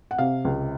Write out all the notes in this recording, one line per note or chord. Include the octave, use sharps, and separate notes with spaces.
F#5
C3 F5
C#2